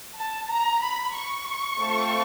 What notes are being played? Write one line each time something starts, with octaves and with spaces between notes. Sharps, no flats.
A5
A#5
B5
C#6
A3 C4 F4 A4